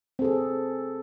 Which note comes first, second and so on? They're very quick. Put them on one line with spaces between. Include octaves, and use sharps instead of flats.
C4 A4 G#4